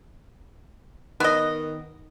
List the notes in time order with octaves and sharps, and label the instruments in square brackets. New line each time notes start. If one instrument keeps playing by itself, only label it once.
[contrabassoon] D#3 [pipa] B3 D#5